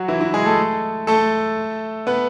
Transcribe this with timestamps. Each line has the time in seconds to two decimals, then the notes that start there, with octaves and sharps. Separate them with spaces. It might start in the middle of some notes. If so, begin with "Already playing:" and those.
Already playing: F#3 F#4
0.08 E3 E4
0.21 E3 E4
0.34 G#3 G#4
0.45 A3 A4
1.07 A3 A4
2.07 B3 B4